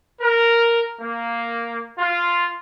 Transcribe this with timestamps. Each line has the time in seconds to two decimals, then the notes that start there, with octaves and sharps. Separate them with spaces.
0.21 A#4
1.01 A#3
1.99 F4